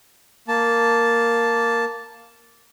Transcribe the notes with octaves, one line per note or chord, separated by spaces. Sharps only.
A#3 A5